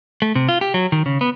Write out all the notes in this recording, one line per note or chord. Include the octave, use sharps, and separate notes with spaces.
A3
C3
F4
G4
F#3
D#3
C#3
B3